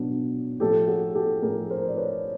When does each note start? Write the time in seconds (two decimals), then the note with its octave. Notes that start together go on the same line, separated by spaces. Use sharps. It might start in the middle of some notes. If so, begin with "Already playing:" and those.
Already playing: B2 F#3 B3 D4
0.60 A2 F3 A3 C#4 G4 A4
0.88 F#4 G#4
1.15 G4 A4
1.42 A2 F3 A3 C#4 G#4 A#4
1.70 A#4 C5
1.88 D5
1.97 B4 C#5